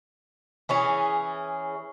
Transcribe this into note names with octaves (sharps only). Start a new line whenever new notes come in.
E3 C#4 G#4